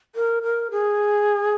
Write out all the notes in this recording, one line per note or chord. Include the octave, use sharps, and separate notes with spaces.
A#4
A#4
G#4